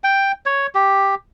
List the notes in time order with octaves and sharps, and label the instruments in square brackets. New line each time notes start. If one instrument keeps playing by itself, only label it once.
[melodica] G5
C#5
G4